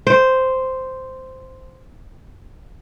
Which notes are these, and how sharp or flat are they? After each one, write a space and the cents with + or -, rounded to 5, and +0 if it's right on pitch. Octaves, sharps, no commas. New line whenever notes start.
C5 -5